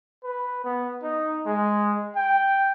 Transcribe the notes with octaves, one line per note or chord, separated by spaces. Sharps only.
B4
B3
D#4
G#3
G5